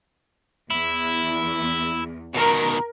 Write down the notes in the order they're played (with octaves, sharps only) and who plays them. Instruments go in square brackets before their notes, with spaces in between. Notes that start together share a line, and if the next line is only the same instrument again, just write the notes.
[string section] E2 [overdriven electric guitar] E4
[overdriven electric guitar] B2 D#3 [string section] A#4